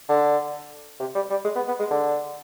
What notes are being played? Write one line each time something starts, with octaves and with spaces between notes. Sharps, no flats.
D3
C3
G3
G3
G#3
B3
B3
G#3
D3